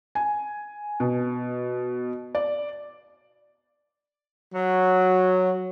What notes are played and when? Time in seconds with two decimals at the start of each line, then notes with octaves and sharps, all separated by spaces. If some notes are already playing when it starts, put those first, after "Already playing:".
0.15 G#5
1.00 B2
2.35 D5
4.54 F#3